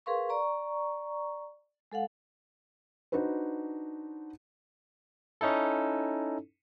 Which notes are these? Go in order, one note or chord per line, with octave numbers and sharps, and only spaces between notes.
G#4 A#4 B4 F5 C6 C#6
D5 A#5 C#6
G#3 A4 F5 F#5
D4 D#4 F#4 B4 C5
C#4 D#4 E4 A4